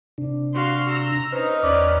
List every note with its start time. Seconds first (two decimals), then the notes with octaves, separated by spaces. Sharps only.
0.18 C3 D4
0.54 F#4 F5 C6
0.89 A#5 E6
1.32 C#4 D#4 B4 C5 F6
1.63 E2 C#4 B4 D5 F6